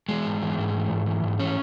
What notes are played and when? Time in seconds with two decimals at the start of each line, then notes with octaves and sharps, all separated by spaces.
0.09 E3 G#3
0.25 G#2
0.42 E3
0.58 G#2
0.74 E3
0.91 G#2
1.06 E3
1.23 G#2
1.40 E3 C#4